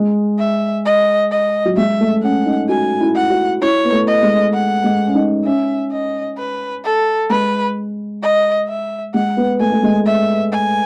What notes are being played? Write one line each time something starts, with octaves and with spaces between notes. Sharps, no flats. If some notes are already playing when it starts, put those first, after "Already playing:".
Already playing: G#3
E5
D#5
D#5
F#3
G#3 E5
A3
C#4 F#5
D#4
F#4 G#5
E4
F#5
F#4
E4 C#5
B3
A3
D#5
G#3
F#5
G#3
C#4
D#4
C#4 E5
D#5
B4
A4
G#3 B4
D#5
E5
G#3 F#5
B3
A3 G#5
A3
G#3
E5
G#5